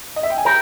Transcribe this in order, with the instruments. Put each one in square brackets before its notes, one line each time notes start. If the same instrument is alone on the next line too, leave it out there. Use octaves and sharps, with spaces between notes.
[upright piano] D#5
E5
G5
G#5
[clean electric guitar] G4 A#4 [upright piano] A#5